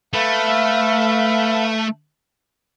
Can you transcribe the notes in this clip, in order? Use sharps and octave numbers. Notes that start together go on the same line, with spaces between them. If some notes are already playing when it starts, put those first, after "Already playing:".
A3 B4 E5 F5